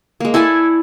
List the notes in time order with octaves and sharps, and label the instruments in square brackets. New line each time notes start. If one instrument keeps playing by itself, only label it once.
[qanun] G#3 A#3
E4 A4 D5 G#5